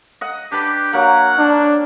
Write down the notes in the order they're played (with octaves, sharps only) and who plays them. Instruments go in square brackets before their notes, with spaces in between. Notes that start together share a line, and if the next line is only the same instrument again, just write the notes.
[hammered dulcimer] D#5 F#5
[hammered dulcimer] D4 B4 [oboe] G4
[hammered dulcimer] F#3 A#3 [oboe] F#5
[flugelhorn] D4